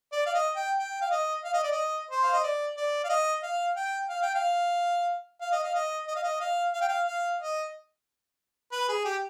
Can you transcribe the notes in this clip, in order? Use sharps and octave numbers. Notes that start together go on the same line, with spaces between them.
D5
F5
D#5
G5
G5
F5
D#5
F5
D#5
D5
D#5
C5
F5
D#5
D5
D5
F5
D#5
F5
G5
F5
G5
F5
F5
D#5
F5
D#5
D#5
F5
D#5
F5
F5
G5
F5
F5
D#5
B4
G#4
G4